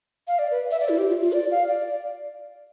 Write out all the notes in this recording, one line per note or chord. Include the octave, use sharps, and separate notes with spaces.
F5
D5
B4
E5
D5
E4
G4
F4
F4
D5
F5
D5